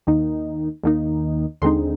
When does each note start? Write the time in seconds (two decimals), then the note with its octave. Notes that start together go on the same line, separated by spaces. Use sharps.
0.07 D#2 D#3 A#3 D#4
0.83 D#2 D#3 A#3 D#4
1.62 D#2 D3 G#3 C4 D#4 C6